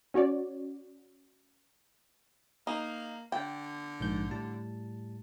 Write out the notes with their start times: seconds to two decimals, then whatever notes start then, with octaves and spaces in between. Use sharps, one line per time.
0.14 C#4 F#4 C#5 D5
2.67 A#3 D#4
3.32 D3 G5
4.00 A#1 G#2 G6
4.30 A2 G3 A5